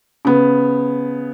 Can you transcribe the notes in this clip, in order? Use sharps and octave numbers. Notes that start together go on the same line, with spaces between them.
C#3 B3